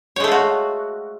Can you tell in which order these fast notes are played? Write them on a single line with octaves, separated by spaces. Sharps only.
C#5 G#3 A3 F4 F#4